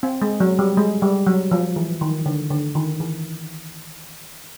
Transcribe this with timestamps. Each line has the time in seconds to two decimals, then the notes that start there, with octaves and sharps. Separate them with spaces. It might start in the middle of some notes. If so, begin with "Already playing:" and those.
0.03 C4
0.22 G#3
0.40 F#3
0.59 G3
0.77 G#3
1.02 G3
1.27 F#3
1.51 F3
1.76 E3
2.01 D#3
2.26 D3
2.51 D3
2.75 D#3
3.00 E3